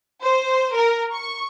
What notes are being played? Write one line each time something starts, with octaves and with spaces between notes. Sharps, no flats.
C5
A#4
C#6